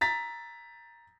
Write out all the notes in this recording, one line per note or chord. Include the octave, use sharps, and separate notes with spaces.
A#5 A6 B6